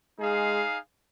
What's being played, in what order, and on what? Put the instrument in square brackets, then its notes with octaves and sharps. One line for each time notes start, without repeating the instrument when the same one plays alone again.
[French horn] G#3 [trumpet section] D#4 G#4 F5